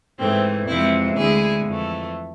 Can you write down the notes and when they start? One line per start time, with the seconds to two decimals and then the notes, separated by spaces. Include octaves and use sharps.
0.19 G#2 E3 A3 C4
0.67 F2 C3 E3 G#3 C4 E4
1.16 D2 D3 G#3 E4 G#4
1.65 F2 E3 A3